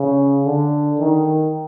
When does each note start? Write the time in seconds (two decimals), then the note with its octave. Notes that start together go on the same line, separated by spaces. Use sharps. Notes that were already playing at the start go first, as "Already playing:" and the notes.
Already playing: C#3
0.46 D3
0.99 D#3